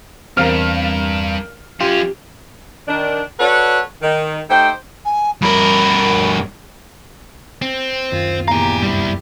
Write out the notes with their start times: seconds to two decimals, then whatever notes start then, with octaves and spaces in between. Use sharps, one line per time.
0.37 E2 G2 C4 A#4 F5 F6
1.81 F#2 C#4 F4 G4
2.88 D#3 D4
3.40 F#4 A4 B4 C#5 D5 F#5
4.02 D#3
4.50 A3 D#4 G4 C5 G5
5.05 G#5
5.42 G2 A#4 B5
7.62 C4
8.12 D1 F#2 D#3 F4
8.48 E2 A#2 G4 F5 G#5 A#5
8.83 G2 G3 E4